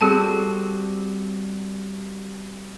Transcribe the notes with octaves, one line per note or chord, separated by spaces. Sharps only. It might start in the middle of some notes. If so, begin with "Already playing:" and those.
G3 C4 F#4 G#4 A4 A5